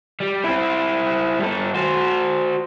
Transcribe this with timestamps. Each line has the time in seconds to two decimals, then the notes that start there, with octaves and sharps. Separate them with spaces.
0.20 G3
0.44 C4 E4
1.40 G2 A4
1.74 F#4 C5